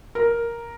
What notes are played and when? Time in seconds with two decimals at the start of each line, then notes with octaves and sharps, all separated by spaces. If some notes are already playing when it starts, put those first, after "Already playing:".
0.15 A#4